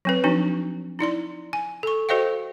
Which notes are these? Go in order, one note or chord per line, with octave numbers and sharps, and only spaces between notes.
F#3 C4 B4
F3 C4 D4 D#4 F#4
D#4 E4 D5 C6
G#5
A4 C#6
F#4 A4 C5 D#5 F5 G5